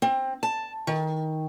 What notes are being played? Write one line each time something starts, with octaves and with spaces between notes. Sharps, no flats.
C4
A5
D#3